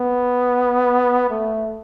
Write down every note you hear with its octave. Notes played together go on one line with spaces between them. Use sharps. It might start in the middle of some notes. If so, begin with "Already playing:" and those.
Already playing: B3
A3